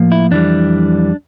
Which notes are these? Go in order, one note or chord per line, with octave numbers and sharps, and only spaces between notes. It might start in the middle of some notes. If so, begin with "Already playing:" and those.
Already playing: A2 F3 A#3
E4
F2 E3 G3 D4